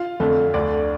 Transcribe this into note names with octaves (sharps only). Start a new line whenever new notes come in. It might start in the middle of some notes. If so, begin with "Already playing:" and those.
Already playing: F4 F5
F2 D3 A3
D2 D3 A3 D4 D5